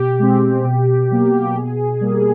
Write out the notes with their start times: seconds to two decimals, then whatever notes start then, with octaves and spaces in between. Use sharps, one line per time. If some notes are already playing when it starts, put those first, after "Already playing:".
Already playing: B2 G4
0.19 G#3 C4
0.64 B2
1.10 F#3 A#3
1.55 B2 G#4
2.01 G3 A#3